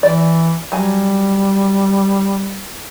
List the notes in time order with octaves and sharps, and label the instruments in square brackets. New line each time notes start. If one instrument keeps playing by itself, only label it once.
[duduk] E3 [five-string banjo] D5
[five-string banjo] F#3 G#5 [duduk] G3